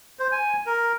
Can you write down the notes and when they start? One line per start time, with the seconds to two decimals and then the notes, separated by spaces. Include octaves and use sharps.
0.19 C5
0.32 G#5
0.66 A#4